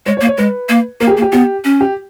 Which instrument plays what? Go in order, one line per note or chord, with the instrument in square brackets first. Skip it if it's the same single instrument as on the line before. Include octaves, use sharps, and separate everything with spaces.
[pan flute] G#3 [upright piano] C#5
[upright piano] C#5
[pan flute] A#3
[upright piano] C#5
[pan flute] G#3 [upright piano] B4
[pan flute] A#3
[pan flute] A#3 [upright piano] A#4
[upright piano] G4
G#4
[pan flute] A#3
[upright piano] G4
[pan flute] B3 [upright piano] G4
[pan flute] C#4
[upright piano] G4